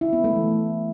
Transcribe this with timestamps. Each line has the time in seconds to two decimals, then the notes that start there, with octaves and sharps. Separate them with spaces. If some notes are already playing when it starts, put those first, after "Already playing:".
0.01 E4
0.13 B3
0.24 A3
0.36 E3